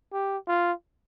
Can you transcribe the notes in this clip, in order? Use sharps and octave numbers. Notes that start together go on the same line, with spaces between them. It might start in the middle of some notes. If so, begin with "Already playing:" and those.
G4
F4